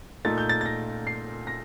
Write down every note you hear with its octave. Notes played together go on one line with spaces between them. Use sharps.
A#2 A3 D#4 A6
G6
A6
A6
A#6
C7
A#6